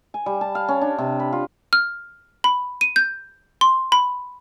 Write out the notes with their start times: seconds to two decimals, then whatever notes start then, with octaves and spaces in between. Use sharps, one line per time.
0.14 G#5
0.26 G3
0.41 A5
0.55 F5
0.68 C#4
0.81 D4
0.98 C3
1.20 B5
1.33 F4
1.73 F6
2.44 B5
2.81 D#7
2.96 G6
3.61 C6
3.92 B5